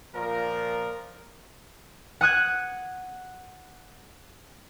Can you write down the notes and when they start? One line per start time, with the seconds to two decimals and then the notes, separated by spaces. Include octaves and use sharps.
0.15 A#2 F3 A#4
2.21 F#5 D#6 F#6 G#6